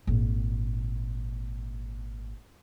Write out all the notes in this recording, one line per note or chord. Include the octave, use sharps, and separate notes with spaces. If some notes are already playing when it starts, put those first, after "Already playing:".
G#1 A#2